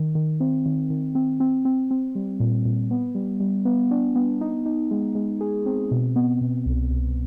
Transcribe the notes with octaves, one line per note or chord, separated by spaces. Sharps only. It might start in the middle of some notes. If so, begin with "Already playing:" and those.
Already playing: D#3
D#3
C4
D#3
D#3
C4
C4
C4
C4
G3
A#2
A#2
B3
G3
G3
B3
D4
B3
D#4
D#4
G#3
G#3
G#4
C4
B2
B3
B2
C2
C2